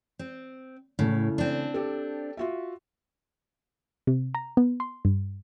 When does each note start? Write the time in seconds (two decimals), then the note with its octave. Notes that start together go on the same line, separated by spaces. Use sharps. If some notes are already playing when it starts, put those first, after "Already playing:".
0.19 C4
0.99 A2 C#3 A3
1.38 C4 D4
1.74 G4 A4
2.37 F4 F#4 E5
4.07 C3
4.35 A#5
4.57 B3
4.80 C6
5.05 G2